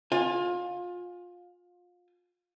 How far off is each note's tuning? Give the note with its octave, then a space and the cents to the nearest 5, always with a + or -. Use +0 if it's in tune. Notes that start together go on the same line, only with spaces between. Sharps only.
F4 +25 G#5 -15